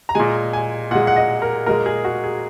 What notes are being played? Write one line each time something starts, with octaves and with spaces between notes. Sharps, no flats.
A#5
A#2 G#3 G#5
G#5
A#2 G#3 F#5
F#5
D#5
A#4
A#2 G#3 A#4
G#4
F#4
G#4